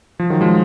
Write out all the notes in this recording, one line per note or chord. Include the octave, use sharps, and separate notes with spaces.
F3
D#3 F#3
F3 G#3